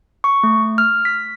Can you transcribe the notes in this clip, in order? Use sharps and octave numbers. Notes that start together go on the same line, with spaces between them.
C#6
A3
F6
B6